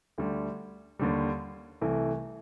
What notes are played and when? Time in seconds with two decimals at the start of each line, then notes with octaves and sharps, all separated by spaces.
0.18 D2 D3 G3
0.99 D#2 D3 G3
1.81 C2 C3 E3 A3